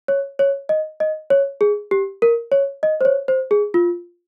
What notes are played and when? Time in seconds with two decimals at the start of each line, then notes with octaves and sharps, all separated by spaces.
0.08 C#5
0.39 C#5
0.69 D#5
1.00 D#5
1.30 C#5
1.61 G#4
1.91 G4
2.22 A#4
2.52 C#5
2.83 D#5
3.01 C5
3.05 C#5
3.28 C5
3.51 G#4
3.74 F4